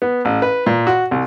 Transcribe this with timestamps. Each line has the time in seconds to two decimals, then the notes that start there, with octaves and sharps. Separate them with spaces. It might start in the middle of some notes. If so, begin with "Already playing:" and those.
0.02 B3
0.25 A1
0.42 B4
0.66 A#2
0.87 F#4
1.11 C2